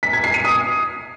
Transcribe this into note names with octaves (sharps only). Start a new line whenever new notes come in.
B6
G#6
C7
D#7
D#6